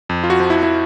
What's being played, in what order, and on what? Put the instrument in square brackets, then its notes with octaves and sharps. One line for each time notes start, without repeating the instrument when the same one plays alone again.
[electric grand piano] F2
F4
F#4
F3
E4
E4